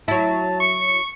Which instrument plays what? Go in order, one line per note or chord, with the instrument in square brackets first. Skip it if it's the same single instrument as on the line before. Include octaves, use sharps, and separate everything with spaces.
[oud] F#3 E4 [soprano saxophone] A5
[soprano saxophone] C#6 [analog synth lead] C#7